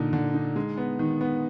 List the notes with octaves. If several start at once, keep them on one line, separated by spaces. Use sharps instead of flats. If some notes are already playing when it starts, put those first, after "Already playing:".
Already playing: A#2 D3 D#4
D3
D#4
G#3
B3
D#3
B3